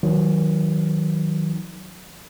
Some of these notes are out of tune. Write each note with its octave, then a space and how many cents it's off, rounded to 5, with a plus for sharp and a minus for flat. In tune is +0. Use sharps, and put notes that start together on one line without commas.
D#3 +30 F#3 +0